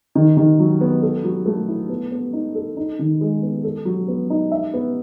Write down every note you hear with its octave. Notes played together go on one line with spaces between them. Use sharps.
D#3
D#3
F#3
B3
A4
F#3
A3
E4
B3
B3
D#4
A4
D#4
D#3
G#3
B3
A4
F#3
B3
D#4
E5
B3